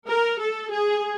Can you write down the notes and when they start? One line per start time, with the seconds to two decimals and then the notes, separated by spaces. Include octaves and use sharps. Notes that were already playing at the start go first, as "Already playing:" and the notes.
0.09 A#4
0.39 A4
0.70 G#4